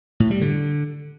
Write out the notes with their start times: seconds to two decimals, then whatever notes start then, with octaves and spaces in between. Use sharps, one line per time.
0.20 A2
0.31 G3
0.41 D3